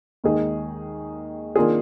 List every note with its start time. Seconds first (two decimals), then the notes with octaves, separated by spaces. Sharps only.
0.24 D#2 D#3 G#3 D#4 G#4
1.56 D#3 A#3 D4 F4 G#4